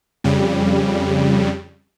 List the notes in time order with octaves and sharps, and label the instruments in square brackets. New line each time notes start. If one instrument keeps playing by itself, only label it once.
[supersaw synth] F2 C#3 G3